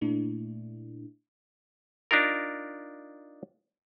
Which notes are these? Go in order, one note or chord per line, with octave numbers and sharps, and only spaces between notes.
A#2 A3 D4 E4
D4 D#4 F4 A#4